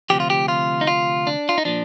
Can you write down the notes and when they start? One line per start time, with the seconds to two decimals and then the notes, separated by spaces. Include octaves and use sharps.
0.10 D2 C3 F3 G4
0.20 F4
0.30 G4
0.48 F4
0.81 D#4
0.87 F4
1.27 D4
1.49 F4
1.58 D#4
1.65 A#2 F3 D4